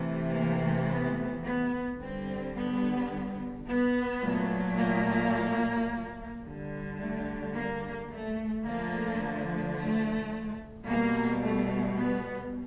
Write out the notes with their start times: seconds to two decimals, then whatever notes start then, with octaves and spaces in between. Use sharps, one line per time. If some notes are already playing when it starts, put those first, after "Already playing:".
Already playing: C3 E3 A3
0.35 A#3
0.90 B3
1.46 B3
2.01 D3 G3 C4
2.56 B3
3.67 B3
4.22 A#2 F#3 A3
4.78 A#3
6.44 D3 G3
6.99 A3
7.54 A#3
8.09 A3
8.64 D3 F3 A3 A#3
9.75 A3
10.86 B2 G3 A#3
11.41 A3
11.97 B3